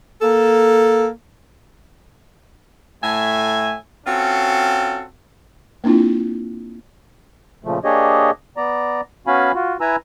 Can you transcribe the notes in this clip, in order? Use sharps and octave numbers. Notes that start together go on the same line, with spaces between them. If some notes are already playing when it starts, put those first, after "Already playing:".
A#3 A4
A2 A3 E5 G#5
C4 C#4 F4 F#4 A4
A#3 C4 D4 E4 F4
A#2 C#3 F3 A3
A#3 D4 G4 G#4 C#5 D#5
B3 D5 A#5
B3 C#4 F#4 F5 G#5 B5
F4 F#4
E4 B4 G#5 A#5 E6